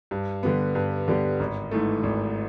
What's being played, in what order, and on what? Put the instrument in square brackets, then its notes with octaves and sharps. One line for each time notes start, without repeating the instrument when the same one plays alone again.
[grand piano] G2
D3 G3 B3
G2
D3 G3 B3
G#1
G#2 E3 A3
G#1